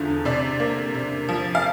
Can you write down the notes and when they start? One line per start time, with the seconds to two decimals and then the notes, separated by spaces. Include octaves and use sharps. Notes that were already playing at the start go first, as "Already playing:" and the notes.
Already playing: E2 D3 F3 A3
0.25 C3 D5
0.60 A#3
0.94 C3
1.29 F3
1.55 F5